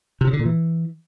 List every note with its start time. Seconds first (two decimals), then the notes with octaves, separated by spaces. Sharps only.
0.21 C3
0.27 C#3
0.33 D3
0.39 A#2
0.45 E3